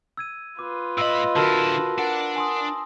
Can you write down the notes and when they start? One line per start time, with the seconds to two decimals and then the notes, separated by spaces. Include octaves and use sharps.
0.17 E6 G#6 D#7
0.59 F4 B4 D6
0.98 A2 D#5 F5 B5 E6
1.36 D3 E4 F#4 A#4 A5 E6 F6 A#6
1.98 D4 A#4 F#5 C#7
2.36 G#5 C6 D#6